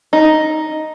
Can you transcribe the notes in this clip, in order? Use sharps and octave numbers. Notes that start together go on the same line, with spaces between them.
D#4